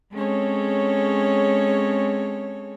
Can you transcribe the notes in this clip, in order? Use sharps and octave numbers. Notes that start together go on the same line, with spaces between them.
G#3 C4 C#4 G#4 A4 C#5